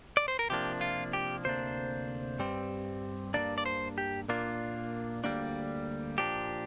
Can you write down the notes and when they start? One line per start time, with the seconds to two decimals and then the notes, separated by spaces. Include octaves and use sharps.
0.17 D5
0.28 C5
0.39 A#4
0.50 C3 F3 A#3 D4 G4
0.81 F4
1.13 G4
1.44 D2 C3 A#3 D4 C5
2.39 G2 G3 C4
3.34 G2 D3 A#3 D4 D5
3.58 D5
3.66 C5
3.98 G4
4.29 A#2 A#3 D4 F4
5.24 D2 D3 G3 A#3 D4
6.18 A#2 F3 D4 G4